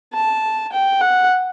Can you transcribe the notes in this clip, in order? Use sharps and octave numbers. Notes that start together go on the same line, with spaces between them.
A5
G5
F#5